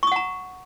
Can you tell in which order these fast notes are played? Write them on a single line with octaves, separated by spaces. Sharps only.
C#6 D#6 F#5 A#5